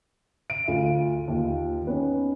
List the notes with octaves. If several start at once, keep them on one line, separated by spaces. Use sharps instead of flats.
D7 D#7
D2 F4
D#2 F4
B3 C#4 D#4